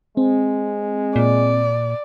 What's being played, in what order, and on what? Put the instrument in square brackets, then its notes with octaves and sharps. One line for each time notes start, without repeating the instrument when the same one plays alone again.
[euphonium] G#3 [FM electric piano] C4
[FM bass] A#2 [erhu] D5